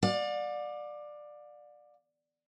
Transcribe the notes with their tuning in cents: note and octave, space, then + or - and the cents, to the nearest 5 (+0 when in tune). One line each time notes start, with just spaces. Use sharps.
D5 +15 F5 +45